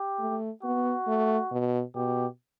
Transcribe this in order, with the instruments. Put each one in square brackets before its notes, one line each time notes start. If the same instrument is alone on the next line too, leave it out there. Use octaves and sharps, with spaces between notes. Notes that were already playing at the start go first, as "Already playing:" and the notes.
Already playing: [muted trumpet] G4
[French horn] A3
[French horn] B3 [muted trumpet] F#4
[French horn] A3
B2
[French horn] B2 [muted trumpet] G4